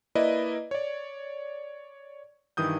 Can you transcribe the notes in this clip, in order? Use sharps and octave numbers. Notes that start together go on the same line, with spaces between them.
A#3 E4 B4 D5 D#5
C#5 D5
G2 D#3 E3 D#6 G6